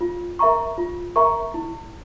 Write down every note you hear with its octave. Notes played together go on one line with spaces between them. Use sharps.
F4
A#4 E5 A#5 C#6
F4
A#4 E5 A#5 C#6
E4